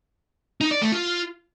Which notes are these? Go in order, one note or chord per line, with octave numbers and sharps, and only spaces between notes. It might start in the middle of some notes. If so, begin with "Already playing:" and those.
D#4
D5
A3
F4